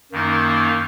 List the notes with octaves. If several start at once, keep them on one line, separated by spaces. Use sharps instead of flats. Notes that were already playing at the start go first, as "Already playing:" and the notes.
F#2 D#3 A#3 D#4